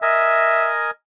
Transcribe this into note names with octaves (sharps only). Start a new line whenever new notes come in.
A#4 D#5 E5 G#5